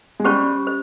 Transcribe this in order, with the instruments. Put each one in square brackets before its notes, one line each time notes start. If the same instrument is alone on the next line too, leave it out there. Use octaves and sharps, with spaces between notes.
[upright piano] G#3
[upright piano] G3 [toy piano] C#4 G4 C5 G5 C#6
[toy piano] C5